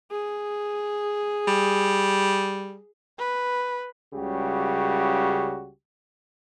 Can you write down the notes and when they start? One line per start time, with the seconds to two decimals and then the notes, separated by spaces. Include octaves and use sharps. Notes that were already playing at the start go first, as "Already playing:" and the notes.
0.11 G#4
1.47 G3
3.18 B4
4.14 C#2 C#3 G3 F#4 G4